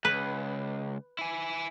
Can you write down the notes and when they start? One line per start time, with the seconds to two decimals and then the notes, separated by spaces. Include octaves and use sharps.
0.05 C#2 B4
1.19 E4 G#5